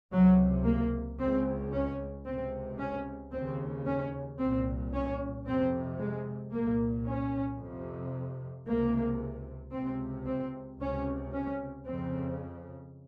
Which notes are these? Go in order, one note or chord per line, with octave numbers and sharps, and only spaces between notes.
C#2 C3 F#3
A#3
C#2 C#3 C4
C#4
C#2 C3 C4
C#4
D#2 C#3 C4
C#4
C2 A#2 C4
C#4
F2 C3 C4
G#3
C2 A#2 A#3
C#4
F2 C3
C#2 C3 A#3
C#2 C3 C4
C4
C#2 C3 C#4
C#4
F2 C#3 C4